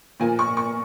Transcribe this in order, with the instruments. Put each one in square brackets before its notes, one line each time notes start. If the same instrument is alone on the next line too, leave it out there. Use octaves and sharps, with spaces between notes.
[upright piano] A#2 F3 A#3 G#5
C#6
C#6